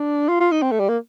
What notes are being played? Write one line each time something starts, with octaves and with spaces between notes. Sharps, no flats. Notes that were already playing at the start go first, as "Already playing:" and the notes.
Already playing: D4
F4
F4
D#4
C4
A3
G3
A#3